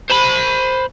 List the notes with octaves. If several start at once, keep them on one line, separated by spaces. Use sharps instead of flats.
C5 B5